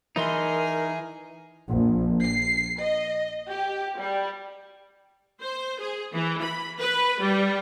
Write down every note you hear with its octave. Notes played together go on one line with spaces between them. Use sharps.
E3 D#4 G#4 A#4 D#5 C6
A#1
C7
D#5
G4
G3
C5
G#4
E3
B5
B4
G3